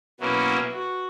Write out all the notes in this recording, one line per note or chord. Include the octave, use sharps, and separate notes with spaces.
B2 F#3 A#3 C#4 E4 B4
F#4